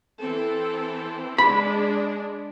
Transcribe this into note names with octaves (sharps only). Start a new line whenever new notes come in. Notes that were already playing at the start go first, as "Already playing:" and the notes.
E3 C4 A4
G#3 D4 B5